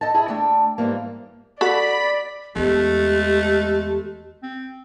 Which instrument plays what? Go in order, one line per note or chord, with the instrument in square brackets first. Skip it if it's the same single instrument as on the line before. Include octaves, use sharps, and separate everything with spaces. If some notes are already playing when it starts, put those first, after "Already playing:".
[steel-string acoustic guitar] A4 D#5 G5 A5
E4 G#4 E5
A3 D4 G5 A5
G#2 E3 G3 A#3
[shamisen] F#4 A4 F#5 [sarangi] D5 [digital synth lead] B5
[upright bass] E2 D4 [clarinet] G#3 [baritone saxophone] A3 [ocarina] G4
[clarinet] C4